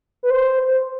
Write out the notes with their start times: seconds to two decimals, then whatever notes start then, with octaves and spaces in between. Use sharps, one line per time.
0.23 B4
0.30 C5